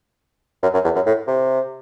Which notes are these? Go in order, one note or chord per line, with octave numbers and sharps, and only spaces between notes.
F#2
F#2
E2
F#2
A2
C3